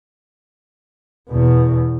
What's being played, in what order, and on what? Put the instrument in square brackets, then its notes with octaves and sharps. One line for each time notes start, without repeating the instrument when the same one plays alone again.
[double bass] E2 B2